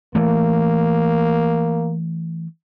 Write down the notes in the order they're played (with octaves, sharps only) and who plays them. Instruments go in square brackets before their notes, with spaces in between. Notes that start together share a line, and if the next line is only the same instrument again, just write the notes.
[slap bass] E3 A3 [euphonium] A#3